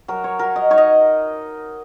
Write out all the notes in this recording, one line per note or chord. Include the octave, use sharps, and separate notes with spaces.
F#3 A#4
C#5
F#3 A#4
D#5
D#4 C#5
D#5